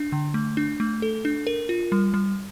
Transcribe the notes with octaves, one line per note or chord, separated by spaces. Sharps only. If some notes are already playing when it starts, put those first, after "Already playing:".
Already playing: D4
D3
A3
D4
A3
A4
D4
A#4
F4
G3
G3